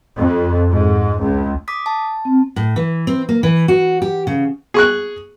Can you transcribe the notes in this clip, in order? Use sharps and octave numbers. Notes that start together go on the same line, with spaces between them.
F2
G#2
C#2
D6 D#6 B6
A5
C4
A2
E3
C4
A#3
E3
F#4
G4
C#3
G#4 C#6 F#6